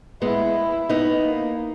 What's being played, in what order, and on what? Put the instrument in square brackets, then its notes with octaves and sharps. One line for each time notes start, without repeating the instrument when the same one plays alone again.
[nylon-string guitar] G#3 B3 [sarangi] E4
[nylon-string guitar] B3 D#4
[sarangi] A#3